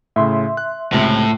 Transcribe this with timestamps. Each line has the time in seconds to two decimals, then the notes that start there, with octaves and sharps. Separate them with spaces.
0.16 A2 C#3 E5 C6
0.57 F#6
0.93 C#2 A2 C3